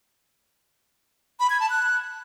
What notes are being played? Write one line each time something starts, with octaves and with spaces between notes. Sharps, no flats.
B5
G#6
A5
F#6